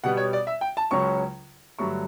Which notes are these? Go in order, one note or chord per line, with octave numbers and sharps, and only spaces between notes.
B2 G3 B3 F#5
C#5
D5
E5
G5
A5
C#2 C#3 F#3 C#4 C#6
G2 D3 F#3 A3 C#6